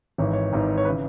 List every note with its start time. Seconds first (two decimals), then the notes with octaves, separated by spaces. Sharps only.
0.18 G#1 G#2 E3 C#5
0.33 C#5
0.53 G#1 G#2 E3
0.78 C#5
0.85 B4
0.88 C#3 E3